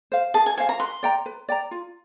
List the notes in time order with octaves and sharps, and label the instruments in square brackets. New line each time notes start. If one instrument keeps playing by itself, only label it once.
[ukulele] C5 F5
[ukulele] G#4 [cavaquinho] A5
[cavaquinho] G#5
[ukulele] C5 F5 [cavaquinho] G#5
[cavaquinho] A#5
[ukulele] B4 [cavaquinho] C6
[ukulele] D5 G5 A#5
B4
D5 G5 A#5
F4